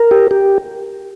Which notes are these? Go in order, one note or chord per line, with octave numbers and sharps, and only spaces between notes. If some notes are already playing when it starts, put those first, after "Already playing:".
Already playing: A#4
G4
G4